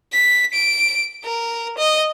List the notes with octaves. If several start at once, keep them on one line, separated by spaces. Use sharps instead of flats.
B6
D7
A#4
D#5